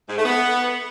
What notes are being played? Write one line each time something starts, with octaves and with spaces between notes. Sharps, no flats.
G#2
A3
B3